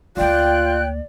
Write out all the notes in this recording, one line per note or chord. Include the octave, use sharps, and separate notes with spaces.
D2 A#3 F4 D5 G5 F#6